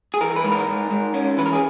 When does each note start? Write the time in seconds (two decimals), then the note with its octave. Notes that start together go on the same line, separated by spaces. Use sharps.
0.14 G#4
0.21 E3 A#4
0.36 B4
0.44 G#2
0.52 A#4
0.67 G#2
0.90 G#2
1.14 C#4
1.37 E3 B4
1.46 A#4
1.53 G#4